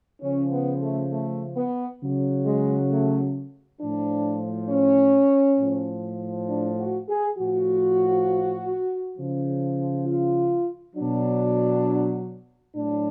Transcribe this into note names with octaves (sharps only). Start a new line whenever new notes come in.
C#3 F3 C#4
B3
A3
A3
B3
C#3 F#3
G#3
A3
A2 F3 D4
C#4
A2 F3
D4
F#4
G#4
A2 F3 F#4
C#3 F3
F4
B2 F#3 D4
A2 F#3 D4